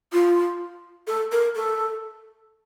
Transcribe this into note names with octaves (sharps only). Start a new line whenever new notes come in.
F4
A4
A#4
A4